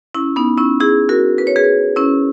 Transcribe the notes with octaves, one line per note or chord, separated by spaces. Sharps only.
C#4 E4
B3 D#4
C#4 E4
E4 G#4
F#4 A#4
B4
C#5
G#4 B4
C#4 E4